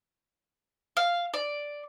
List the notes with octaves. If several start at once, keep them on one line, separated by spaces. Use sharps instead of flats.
F5
D5